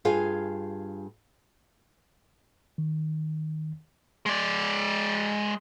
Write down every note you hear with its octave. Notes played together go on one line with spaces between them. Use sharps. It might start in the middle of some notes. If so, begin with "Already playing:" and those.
G2 F4 G#4 F5 G#5
D#3
G#3 D5